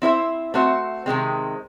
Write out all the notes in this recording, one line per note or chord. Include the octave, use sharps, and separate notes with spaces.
C4 E4 C5 E5
A3 C4 F#4 C5 E5
C3 D#3 G#3 C4